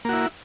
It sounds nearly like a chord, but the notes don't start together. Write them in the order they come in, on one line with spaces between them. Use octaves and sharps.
A#3 F#4 E4